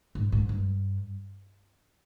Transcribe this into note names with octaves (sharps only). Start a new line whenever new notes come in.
G#2
G#2
G2